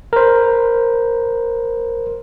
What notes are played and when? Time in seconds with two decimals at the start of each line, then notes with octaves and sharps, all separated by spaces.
0.13 A#4 C5